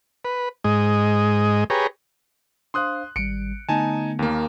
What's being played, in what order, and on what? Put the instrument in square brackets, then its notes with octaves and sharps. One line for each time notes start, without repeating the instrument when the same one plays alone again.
[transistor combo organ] B4
G#2 G#3 D#5
G4 G#4 B4 C#5 A#5
[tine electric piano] D4 C5 F5 [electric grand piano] C6 D#6 F#6
[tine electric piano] G#1 G3 [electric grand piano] C#7 D7
[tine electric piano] D3 A3 B3 [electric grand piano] D#4 G#5 A5
[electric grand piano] D#2 A#3